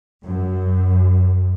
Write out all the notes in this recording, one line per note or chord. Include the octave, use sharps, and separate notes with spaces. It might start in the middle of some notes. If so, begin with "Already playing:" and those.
F#2